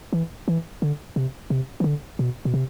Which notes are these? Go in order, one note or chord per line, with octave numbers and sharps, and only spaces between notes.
E3
E3
D3
C3
C3
E3
D3
B2
B2
C3